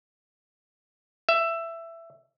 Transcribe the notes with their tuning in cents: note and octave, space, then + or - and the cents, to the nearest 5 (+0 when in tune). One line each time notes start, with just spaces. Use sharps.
E5 +15